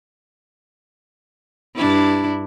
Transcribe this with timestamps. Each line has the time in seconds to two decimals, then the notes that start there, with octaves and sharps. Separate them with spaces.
1.76 G2 D4 E4